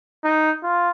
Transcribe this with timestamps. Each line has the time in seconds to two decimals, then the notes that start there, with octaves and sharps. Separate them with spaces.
0.24 D#4
0.63 F4